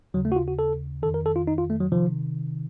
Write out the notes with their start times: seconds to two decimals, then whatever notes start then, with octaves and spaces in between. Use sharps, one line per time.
0.14 D#2 C#3 F#3
0.25 A3
0.32 F#4
0.36 F4
0.48 F#4
0.59 A4
1.02 D#3 A4
1.06 F2
1.14 A#4
1.26 A4
1.36 F4
1.47 D#4
1.58 F4
1.70 A3
1.80 F#3
1.92 C3 D#3 F3